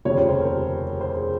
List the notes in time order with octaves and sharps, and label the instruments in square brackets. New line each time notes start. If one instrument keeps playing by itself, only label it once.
[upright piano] F1 D#2 C#3 G3 C#5
C5
C5
A#4
C5
G#4